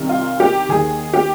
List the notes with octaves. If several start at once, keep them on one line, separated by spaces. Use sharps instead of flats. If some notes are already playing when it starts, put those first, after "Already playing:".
Already playing: C2 C3 D#3
F4
G4
D#2 D#3 G#4
G4